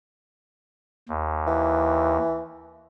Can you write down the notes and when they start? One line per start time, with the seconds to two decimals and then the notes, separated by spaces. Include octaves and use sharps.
1.09 D#2
1.47 E3